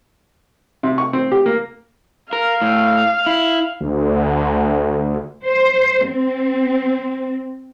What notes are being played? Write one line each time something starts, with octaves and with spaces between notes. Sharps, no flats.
C3
C#6
C4
G4
A#3
A#4 F5
A2
E4
D2
C5
C4